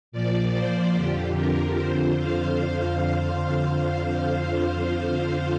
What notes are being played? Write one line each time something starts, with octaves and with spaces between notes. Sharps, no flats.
A#2 F3 D5
C5
F2 D3 F3 G4
A#4
F2 D3 F3 C5
F5